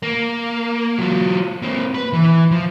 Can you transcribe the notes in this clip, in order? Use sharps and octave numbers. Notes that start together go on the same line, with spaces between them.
A#3
F#3 F4
A#3 C4
B4
E3
F3